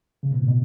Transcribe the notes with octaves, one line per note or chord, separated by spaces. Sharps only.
C#3
B2
A2
B2